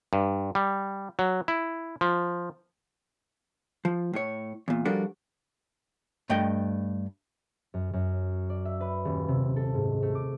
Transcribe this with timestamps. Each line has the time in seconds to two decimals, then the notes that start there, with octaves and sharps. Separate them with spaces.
0.13 G2
0.55 G3
1.19 F#3
1.48 E4
2.01 F3
3.85 F3
4.14 A2 C#5
4.68 E2 A#2
4.85 F3 G3 D4 F#4 A4 A#4
6.30 G2 A3 D#5 G5
7.74 F#2
7.93 F#2
8.50 D5
8.65 E5
8.80 B4
9.05 D#1
9.28 C3
9.56 A4
9.74 G#2
10.03 A3
10.15 D6